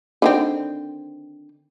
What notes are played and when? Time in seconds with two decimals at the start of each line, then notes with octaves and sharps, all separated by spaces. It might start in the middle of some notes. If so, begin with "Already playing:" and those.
0.22 D3 D#3 C4